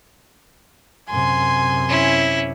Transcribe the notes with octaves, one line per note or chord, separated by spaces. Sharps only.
F#2 C3 G#5 C6
C#4 E4